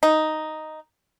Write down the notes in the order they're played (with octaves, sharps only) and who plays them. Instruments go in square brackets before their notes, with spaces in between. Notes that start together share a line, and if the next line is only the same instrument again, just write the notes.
[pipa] D#4